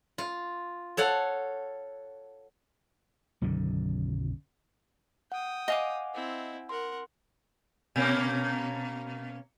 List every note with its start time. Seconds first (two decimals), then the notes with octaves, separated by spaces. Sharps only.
0.18 F4
0.97 A4 C#5 F5 F#5
3.42 B1 F#2 D3 D#3
5.32 F#5 G5 D#6
5.68 D#5 F5 F#5 G#5 D6
6.14 C4 E4
6.69 A#4 F#5 C6
7.96 B2 A#3 C#4